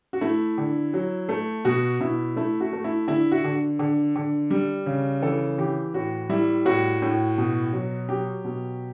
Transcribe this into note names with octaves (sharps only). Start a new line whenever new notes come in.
F#4
A3 E4
D3
F#3
A3
B2 F#4
B2 E4
A3 E4
F#4
A3
E4
D3 E4
F#4
D3
D3
D3
G3
C#3
E3 A4
E3 G4
A2 F#4
G3 E4
A2 F#4
A2
B2
F#3
F#3 G4
B2